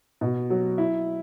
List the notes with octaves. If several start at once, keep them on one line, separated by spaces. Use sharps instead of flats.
B2
F#3
E4